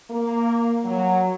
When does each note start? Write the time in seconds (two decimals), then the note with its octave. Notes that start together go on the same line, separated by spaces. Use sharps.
0.11 A#3
0.84 F#3